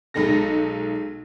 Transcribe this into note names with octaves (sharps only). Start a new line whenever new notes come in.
B1 G#3 D#4 A4 A#6